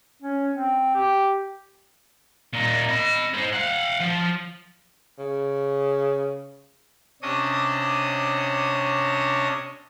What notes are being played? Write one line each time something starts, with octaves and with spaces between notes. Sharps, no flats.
C#4
C4
G4
A#2 D#4
D#5 B5
G#3 C5
F5 F#5
F3
C#3
C3 C#4 D4 C#5 D#5 D#6